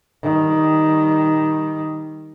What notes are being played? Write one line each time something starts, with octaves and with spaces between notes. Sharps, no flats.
D#3 G3